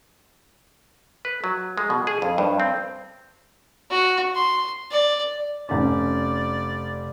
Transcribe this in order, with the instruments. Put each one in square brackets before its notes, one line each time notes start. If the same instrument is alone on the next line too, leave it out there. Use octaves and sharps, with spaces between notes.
[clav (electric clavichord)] B4
F#3
G#3
B2
G#4
F2
G2
C4
[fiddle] F#4
C6
D5
[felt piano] F1 C#4 [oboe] D5